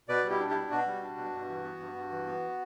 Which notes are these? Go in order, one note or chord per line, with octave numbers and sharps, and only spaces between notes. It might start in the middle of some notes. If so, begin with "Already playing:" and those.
B2 B4 D5
G3
E4 G4
D4
E4 G4
B2
B2 F#4
G3
D4
B2
G2
E3
B3
G2
G2
E3
B3